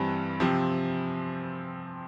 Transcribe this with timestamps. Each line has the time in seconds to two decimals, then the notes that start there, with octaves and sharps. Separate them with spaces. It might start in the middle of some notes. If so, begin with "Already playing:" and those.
Already playing: G2 E3 G3 C4
0.40 C3 F3 C4